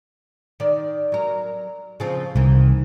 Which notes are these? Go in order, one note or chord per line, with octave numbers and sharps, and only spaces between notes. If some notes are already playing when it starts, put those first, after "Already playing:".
D#3 D5
F#3 A#4
C#3 F3 C4
C2 D#3 E3